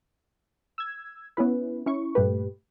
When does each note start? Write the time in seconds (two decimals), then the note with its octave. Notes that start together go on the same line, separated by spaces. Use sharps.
0.78 E6 G#6
1.37 B3 C#4 E4 B4
1.86 C#4 E4 C#6
2.15 G2 A#2 A3 G4 B4